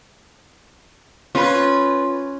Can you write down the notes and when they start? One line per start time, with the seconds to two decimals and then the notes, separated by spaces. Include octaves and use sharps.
1.35 C#4 F4 B4